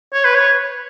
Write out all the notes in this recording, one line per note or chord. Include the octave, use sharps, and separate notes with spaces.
C#5
B4
C#5